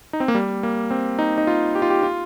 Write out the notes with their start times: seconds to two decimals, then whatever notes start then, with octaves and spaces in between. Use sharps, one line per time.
0.13 D#4
0.20 C4
0.28 A#3
0.35 G3
0.63 A#3
0.91 C4
1.19 D#4
1.38 D#4
1.47 F4
1.75 G4
1.82 F4
1.90 G4
2.03 F4